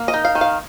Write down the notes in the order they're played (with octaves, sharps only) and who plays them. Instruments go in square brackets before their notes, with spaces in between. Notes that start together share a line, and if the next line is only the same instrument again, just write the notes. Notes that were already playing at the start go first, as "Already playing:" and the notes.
Already playing: [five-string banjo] A#3
D#5
D#4
F5
D#3
F5